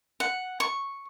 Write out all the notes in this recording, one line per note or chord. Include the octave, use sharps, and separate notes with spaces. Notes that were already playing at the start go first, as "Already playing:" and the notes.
F#5
C#6